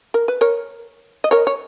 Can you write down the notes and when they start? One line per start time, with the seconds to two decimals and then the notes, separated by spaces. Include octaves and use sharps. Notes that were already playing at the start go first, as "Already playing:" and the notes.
0.14 A#4
0.28 B4
0.41 A#4 C#5
1.24 D#5
1.31 A#4 C#5
1.47 C#5